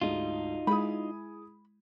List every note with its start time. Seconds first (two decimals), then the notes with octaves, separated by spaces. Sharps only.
0.01 D2 G#2 D#4 F4
0.67 G#3 E4 G#4 B5 D#6